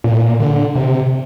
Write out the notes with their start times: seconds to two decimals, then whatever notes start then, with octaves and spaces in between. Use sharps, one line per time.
0.04 A#2
0.11 A2
0.18 A#2
0.40 D3
0.75 C3